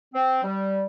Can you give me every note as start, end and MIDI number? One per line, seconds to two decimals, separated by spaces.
0.14 0.39 60
0.43 0.86 55